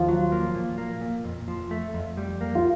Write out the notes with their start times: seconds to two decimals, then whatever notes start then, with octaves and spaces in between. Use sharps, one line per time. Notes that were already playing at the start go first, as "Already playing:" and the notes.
Already playing: D#2 F3 F4
0.08 F#3
0.32 A#3
0.55 A#2
0.78 A#3
1.01 A#2
1.24 F2
1.48 F3
1.71 A3
1.94 F2
2.17 G3
2.41 A#3
2.55 F4